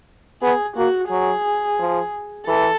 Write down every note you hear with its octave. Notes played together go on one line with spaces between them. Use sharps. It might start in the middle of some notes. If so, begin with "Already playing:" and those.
B3 G#4
A#3 F#4
F#3 G#4
F3
E3 A4